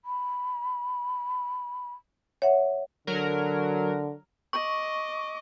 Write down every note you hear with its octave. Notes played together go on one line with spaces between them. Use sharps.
B5
C#5 E5 F#5
D3 F#3 A#4
D#5 C#6 D6